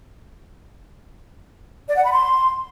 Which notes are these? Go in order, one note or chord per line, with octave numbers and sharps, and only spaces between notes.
D5
F#5
B5
C6